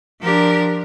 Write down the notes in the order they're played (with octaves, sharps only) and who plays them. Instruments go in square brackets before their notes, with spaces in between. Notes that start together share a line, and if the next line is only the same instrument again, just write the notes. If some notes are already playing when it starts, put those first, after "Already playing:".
[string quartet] F3 D4 G4 A#4